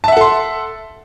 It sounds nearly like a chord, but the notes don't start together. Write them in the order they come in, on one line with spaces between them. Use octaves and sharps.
A5 E5 F#5 A4 C6